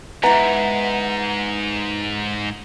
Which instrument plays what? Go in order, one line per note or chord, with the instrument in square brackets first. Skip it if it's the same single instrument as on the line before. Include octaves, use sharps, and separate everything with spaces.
[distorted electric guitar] G#2 [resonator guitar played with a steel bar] B3 E4 [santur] A#5